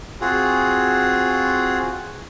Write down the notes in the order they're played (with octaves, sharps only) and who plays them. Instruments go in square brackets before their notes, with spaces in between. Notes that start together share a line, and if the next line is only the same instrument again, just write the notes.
[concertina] C4 F4 F#4 G#4